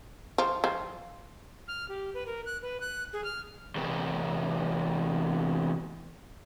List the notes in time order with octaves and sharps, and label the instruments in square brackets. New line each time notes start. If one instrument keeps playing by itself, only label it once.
[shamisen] F3
F3
[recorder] F6
G4
B4
A#4
F#6
B4
F#6
G#4
F6
[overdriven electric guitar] E2 C3